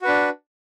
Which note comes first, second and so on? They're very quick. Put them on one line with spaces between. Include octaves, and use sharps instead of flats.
F#4 B4 D4